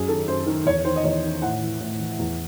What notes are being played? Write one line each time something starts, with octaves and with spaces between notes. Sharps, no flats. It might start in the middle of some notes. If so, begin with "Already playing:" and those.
Already playing: F#2 G#4
D#3 A4
F#2 C5
D#3
E2 C#5
D#3 C5
D#5
E2 C#5
D#3
A2 F#5
E3
A2
E3
E2